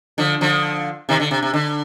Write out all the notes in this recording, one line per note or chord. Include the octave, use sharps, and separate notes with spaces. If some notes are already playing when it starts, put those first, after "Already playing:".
D3 F3
D3 F3
C3 D#3
D3
C3
C3
D3